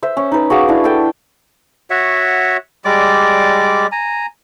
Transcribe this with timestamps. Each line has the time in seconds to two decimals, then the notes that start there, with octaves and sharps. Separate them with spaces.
0.03 C5 E5
0.17 C#4
0.32 D#4 B4
0.50 F#4 G#4 F5 D6
0.68 D4 E4
0.84 A4 G5
1.90 F#4 C#5 E5 F#5
2.85 G3 G#3 D5 D6
3.92 G#5 A#5